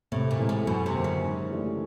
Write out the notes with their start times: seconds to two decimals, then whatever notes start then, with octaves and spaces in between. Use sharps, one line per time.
0.12 A2 C3
0.31 A#2
0.39 E3 G#3 C4
0.49 A2
0.67 F#2 B2
0.86 C3
0.94 D3 F#3 A#3
1.04 C#3
1.22 G#2
1.50 E3 A3 D4 G4